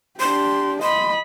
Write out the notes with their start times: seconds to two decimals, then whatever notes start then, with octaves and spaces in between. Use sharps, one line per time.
0.20 D4 G4 C6
0.82 D#5 B5 C6